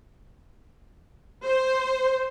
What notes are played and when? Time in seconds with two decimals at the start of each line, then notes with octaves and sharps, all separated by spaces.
1.45 C5